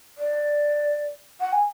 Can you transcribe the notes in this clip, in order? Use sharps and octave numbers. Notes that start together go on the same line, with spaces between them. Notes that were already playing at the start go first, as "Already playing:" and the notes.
D5
F#5
G#5